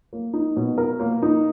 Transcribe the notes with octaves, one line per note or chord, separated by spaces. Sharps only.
A#3
D#4
B2
A#4
A#3
D#4